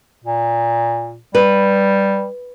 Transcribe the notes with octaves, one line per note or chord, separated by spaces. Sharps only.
A#2
G3 B4